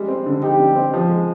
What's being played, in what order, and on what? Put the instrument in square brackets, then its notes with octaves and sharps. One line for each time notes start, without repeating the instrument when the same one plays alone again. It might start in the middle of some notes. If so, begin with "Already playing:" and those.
Already playing: [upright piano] G3 G#3
C4
D3
[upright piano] D#4 [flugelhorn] G4
[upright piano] G3
C4
F3
G#3